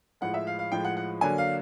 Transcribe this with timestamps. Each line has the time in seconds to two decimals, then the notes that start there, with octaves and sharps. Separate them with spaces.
0.21 A2 F3 G#3 F#5
0.34 E5
0.47 F5
0.59 F5
0.72 A2 F3 G#3 G5
0.85 F#5
0.97 F#5
1.21 D3 F#3 A#3 D4 G#5
1.38 F5